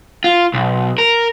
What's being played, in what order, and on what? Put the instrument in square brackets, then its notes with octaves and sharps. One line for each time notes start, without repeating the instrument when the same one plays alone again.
[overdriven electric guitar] F4
B1
A#4